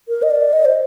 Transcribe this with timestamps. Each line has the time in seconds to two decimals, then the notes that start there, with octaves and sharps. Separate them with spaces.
0.09 A#4
0.22 D#5
0.30 D5
0.53 D#5
0.65 C5